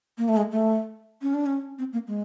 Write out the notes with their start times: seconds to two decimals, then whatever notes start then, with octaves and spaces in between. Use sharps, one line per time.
0.18 A#3
0.28 A3
0.37 G#3
0.52 A3
1.22 C#4
1.34 D4
1.46 C#4
1.79 C4
1.93 A#3
2.08 G#3